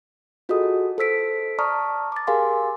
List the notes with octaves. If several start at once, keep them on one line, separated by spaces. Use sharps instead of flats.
F4 F#4 G#4 A4 D#5 D#6
A4 C5 E6 B6 D7
D5 A5 A#5 C#6 D#6 F6
D6 A6
G4 G#4 A#4 F5 G#5 C6